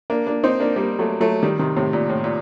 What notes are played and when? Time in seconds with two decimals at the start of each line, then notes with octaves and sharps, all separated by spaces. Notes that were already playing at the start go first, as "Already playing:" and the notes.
0.10 A#3 D4
0.26 A#3 D4
0.44 C4 D#4
0.60 A#3 D4
0.76 G3 A#3
0.99 F#3 A3
1.20 F#3 A3
1.43 D#3 G3
1.59 C3 D#3
1.76 A2 C3
1.93 A#2
2.09 A2
2.24 A#2